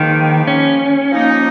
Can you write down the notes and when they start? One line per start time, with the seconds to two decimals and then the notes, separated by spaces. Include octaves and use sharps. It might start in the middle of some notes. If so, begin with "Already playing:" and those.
Already playing: G#2 D#3 F3 A#3 F4 B4
0.47 C#4
1.12 F3 A#3 D#4